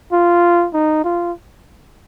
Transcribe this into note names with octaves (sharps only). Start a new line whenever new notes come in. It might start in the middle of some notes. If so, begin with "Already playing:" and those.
F4
D#4
F4